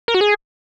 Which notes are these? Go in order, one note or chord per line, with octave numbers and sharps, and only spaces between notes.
A#4
F#4
G#4